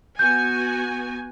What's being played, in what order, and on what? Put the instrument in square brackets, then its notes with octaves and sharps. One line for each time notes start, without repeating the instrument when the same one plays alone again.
[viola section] B3 F#4 G#5 [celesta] G6